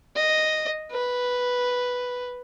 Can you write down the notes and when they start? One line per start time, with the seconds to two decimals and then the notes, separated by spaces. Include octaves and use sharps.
0.16 D#5
0.91 B4